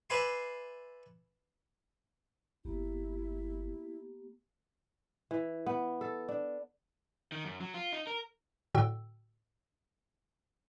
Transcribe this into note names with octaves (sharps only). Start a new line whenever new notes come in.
B4 D5 E5 G#5 B5 C6
G1 A#3 B3 E4 G4
E3
B3
A4
D4
D#3
F#2
F#3
F4
D#4
A#4
A2 D3 F#4 G5 E6